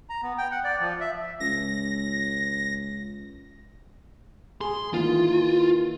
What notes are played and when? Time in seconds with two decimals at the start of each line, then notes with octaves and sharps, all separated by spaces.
0.09 A#5
0.22 B3
0.38 G5
0.51 F#5
0.64 D5
0.80 F3
1.01 E5
1.40 C#2 A#6
4.61 G#4 C6
4.93 D#3 E3 A#3 E4 F4